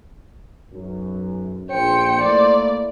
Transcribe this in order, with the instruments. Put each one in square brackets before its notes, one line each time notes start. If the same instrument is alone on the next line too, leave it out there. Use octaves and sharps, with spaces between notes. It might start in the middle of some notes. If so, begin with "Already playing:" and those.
[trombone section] B1 F#2
[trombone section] A#1 [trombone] C5 [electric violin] G5 C#7
[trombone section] A3 A#3 E4 [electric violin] D5